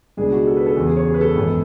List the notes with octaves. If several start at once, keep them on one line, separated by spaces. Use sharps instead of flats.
C#2 B2 G#3 D4 G#4
F#4
A4
B4
A4
E2 C#3 E3
G#4
C#5
G#4
B4
A4
G#1 F#2 E3 B3